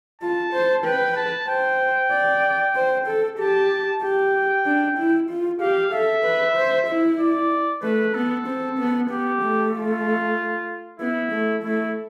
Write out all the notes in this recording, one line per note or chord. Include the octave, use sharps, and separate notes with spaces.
F4 A5
C5
B4 G5
A5
C5 G5
D5
C5
A4
G4 A5
G4 G5
D4
E4
F4
G4 F5
A4 E5
B4
C5
E4
D5
A3 B4
B3 A4
C4
B3
B3 G4
A3
F4
B3 E4
A3
A3 E4